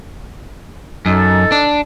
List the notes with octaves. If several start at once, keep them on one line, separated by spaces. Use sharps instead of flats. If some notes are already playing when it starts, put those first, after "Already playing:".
F#2 D#4 A4
D4